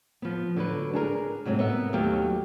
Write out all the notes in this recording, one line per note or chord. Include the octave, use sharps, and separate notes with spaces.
F3 B3
D3 F#3 B4
D4 G#4 A#4
G#2 C3 F#3 A3
B3 A#4 E5
D#2 F#3 A3 G4 F5